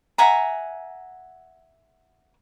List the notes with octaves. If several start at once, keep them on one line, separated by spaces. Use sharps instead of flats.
E5 F#5 G#5 A#5